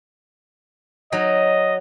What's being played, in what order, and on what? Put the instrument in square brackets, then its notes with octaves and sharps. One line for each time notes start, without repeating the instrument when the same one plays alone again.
[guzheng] F#3 D#4 [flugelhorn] D#5